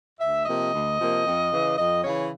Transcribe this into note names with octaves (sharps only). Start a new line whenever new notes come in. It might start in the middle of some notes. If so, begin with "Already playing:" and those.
D2 E5
C3 F3 A#3 D#5
D2
C3 F3 A#3
F2
C#3 E3
F2 D#5
C#3 E3 C#5